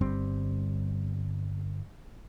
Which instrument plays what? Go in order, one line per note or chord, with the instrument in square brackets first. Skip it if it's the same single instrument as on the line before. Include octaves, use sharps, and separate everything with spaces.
[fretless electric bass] G1 G3 C4